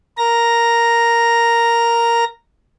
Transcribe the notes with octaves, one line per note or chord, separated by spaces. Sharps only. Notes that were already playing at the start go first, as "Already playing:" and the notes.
A#4 A#5 A#6